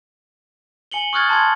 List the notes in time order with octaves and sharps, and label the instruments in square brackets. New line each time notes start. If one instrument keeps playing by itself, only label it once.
[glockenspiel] G#5 C#7 F#7 G7
C#6 D#6 F6 F#6 G#6 A6
A5 B5 C6 G#6